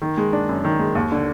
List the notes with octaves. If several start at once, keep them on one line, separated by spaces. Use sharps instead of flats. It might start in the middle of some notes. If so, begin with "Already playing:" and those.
D#3
G#3
D4
F#2
D#3
G#3
D#2
D3